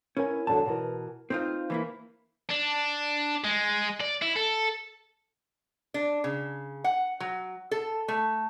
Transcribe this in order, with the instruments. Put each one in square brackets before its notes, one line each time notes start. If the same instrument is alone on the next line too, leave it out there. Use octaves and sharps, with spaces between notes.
[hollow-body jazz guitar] C#4 [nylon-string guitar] E4 A#4 G#5
[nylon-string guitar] E2 D3 F#3 [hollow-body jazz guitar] A5
[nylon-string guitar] B2 E3 A#4
[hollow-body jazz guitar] C4 D#4 F4 [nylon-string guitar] C5
[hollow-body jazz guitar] E3 A#3 E4
[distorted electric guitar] D4
G#3
D5
E4
A4
[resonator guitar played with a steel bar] D4
C#3
F#5
F#3
A4
A3